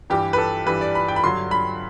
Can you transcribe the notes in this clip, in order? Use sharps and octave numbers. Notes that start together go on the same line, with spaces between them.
G2 E3 G3 G4
B4
A4
G2 E3 G3 B4
D5
B5
G5
B5
G2 D3 F#3 C6
B5